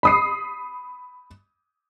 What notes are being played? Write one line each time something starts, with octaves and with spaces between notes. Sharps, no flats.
B5 D#6 C7